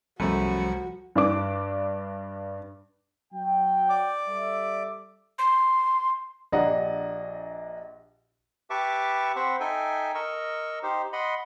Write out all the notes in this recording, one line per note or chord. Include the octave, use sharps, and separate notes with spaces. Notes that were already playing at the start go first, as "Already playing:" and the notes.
C2 F#2 F3 G3 A3 F#4 B5 C#7
G2 D4 D6
F#3 G5
D5 D6
G3 A4 E5
C6
A#1 D4 G4 D#5 F#5 A#5
G4 B4 E5 A5 C#6 D6
C4 C5 F#5 B5 C#6
D#4 A4 E5 G5 G#5
A#4 D#5 C#6 E6
D#4 G4 C5
D#5 F#5 B5 C6